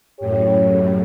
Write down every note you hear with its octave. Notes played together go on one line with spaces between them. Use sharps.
F#2 A2 G4 C#5